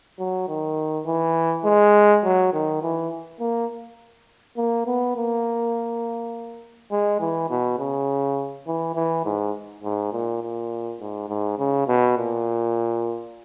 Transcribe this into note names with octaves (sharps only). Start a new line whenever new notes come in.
F#3
D#3
E3
G#3
F#3
D#3
E3
A#3
A#3
B3
A#3
G#3
E3
B2
C#3
E3
E3
G#2
G#2
A#2
A#2
G#2
G#2
C#3
B2
A#2